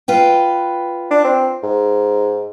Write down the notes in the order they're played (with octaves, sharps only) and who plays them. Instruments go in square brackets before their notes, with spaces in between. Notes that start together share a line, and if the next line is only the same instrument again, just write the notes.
[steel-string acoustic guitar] F4 B4 G5
[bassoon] D4
C4
G#2